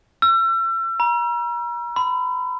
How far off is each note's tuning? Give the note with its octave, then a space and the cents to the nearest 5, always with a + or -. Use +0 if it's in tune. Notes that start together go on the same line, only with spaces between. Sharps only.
E6 +35
A#5 +40
B5 +30